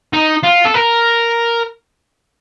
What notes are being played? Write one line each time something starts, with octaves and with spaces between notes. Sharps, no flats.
D#4
F4
A4
A#4